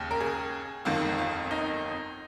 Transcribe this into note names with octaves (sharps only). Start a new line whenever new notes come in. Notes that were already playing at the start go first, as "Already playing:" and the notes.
Already playing: D#2 C#3
A#4
G#4
G1 F2 D#3 F4
F4
D#4